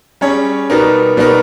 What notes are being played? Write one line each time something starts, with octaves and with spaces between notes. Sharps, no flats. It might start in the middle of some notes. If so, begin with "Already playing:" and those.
G3 C#4 G#4 C#5
B2 G3 B3 D#4 A#4
B2 G3 B3 D#4 A#4